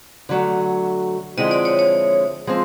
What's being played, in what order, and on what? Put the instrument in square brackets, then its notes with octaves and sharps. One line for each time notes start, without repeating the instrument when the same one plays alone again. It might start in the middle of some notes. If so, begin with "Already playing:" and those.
[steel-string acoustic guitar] D3 F#3 A3
[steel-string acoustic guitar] D3 F3 G#3 C4 E4 [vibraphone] D#5
[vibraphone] D5
C#5
C#5
[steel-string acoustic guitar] F3 G#3 C4